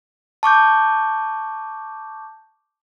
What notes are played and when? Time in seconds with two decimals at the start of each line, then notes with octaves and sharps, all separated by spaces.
0.43 A5 C#6 D6 G6